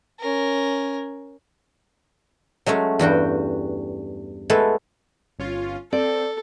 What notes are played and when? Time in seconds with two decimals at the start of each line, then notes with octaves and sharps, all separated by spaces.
0.20 C#4 A#4
2.66 F#3 G#3 A3 C#4
2.99 E2 G2 F#4 G5
4.50 G#3 A3 B3 E4 A4
5.39 G1 C#4 F4
5.93 C4 A4 D5